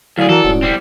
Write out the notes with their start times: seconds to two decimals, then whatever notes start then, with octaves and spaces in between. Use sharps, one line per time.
0.18 D2 F#3 E4 G#4 D5 F5 D7
0.29 E3 F#4 A4 A#4
0.44 D#1 G#2 C#4 F#4
0.62 G3 C4